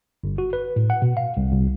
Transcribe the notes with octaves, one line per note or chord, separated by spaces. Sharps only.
G1
F#4
B4
A2
F#5
B2
F5
C2
C2